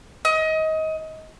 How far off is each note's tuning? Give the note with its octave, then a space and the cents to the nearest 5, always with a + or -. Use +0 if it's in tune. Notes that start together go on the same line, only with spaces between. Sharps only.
D#5 +25